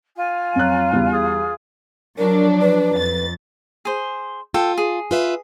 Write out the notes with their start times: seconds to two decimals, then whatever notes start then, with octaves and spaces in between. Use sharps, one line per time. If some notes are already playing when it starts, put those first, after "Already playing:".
0.16 F4 G#5
0.56 F2 F#3 F#6
0.93 E2 C#3 G3
1.11 G#4
2.18 F3 F#3 D4 A#4
2.61 B4
2.96 F2 A6
3.85 G#4 C5
4.54 F4 A4 G5
4.78 G#4
5.11 F4 B4 E5